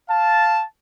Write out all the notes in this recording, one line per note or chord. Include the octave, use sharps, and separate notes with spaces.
F5 A5